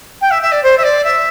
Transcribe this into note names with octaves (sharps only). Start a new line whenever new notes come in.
G5
E5
E5
D5
C5
E5
D5
E5